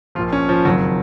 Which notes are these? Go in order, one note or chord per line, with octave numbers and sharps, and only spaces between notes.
A#1 A#2 F3 F4
C#4
F3
F#1 F2 D#3 F#3